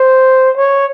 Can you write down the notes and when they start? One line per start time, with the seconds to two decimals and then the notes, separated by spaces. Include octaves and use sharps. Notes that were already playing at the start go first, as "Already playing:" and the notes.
Already playing: C5
0.57 C#5